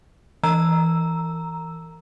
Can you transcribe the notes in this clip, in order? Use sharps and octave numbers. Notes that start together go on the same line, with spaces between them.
E3 A#5 E6